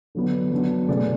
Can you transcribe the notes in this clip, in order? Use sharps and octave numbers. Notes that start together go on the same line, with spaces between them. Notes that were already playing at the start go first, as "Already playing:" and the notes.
D3 F#3 B3
F#3 B3 D4
B2 A3 C#4 G#4 D5